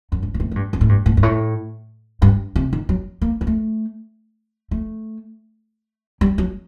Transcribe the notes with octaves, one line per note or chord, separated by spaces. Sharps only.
F#2
G2
A#2
A2
A2
G2
F#2
A2
G2
A2
G2
A2
G2
C3
D#3
F#3
A#3
A#3
A3
A3
G3
F#3